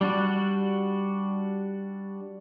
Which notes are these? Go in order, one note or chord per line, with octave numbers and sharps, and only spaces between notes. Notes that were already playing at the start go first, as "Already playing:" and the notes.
G3 D4 F#4